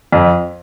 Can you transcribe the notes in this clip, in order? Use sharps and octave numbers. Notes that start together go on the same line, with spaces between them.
F2